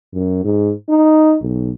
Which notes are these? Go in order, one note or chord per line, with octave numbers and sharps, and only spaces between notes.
F#2
G#2
D#4
B1